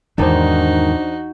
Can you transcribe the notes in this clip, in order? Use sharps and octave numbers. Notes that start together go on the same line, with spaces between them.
E2 G#2 D#3 D4 D#4 F#4 C5